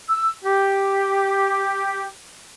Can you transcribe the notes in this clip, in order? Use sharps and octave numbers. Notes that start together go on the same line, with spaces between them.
E6
G4